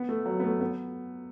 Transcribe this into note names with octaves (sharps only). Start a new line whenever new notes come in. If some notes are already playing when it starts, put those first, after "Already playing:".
Already playing: B3
A3
F#3
B3
A3
B3